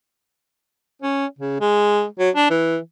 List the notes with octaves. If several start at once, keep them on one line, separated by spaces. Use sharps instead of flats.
C#4
C#3
G#3
F#3
D4
E3